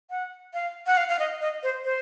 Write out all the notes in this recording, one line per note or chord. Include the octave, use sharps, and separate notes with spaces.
F#5
F5
F#5
F5
F5
D#5
D#5
C5
C5